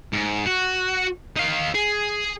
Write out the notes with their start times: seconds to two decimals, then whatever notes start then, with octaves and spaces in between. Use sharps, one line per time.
0.13 G#2
0.47 F#4
1.37 D#4 F5
1.75 G#4